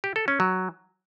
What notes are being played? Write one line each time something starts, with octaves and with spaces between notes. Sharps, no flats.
G4
A4
C#4
F#3